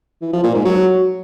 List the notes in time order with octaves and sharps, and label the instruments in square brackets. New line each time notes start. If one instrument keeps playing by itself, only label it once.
[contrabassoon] E3
F3
A#2
G#2
F#3